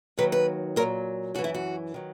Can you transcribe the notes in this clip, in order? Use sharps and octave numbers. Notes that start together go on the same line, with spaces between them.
D#2 D#3 F#3 B4
B4
A#2 F#3 A#4
F#2 E3 F#4
E4
F#4
D#3 F#3